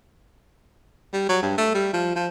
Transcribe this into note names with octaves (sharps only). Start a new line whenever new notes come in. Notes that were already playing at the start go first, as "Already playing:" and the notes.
G3
F#3
G2
A3
G3
F3
F3